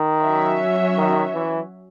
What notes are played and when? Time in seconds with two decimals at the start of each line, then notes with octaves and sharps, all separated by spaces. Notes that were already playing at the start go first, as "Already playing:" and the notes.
Already playing: D#3
0.23 F#3 C#4 F#4 C#5 E5
0.97 D#3
1.34 E3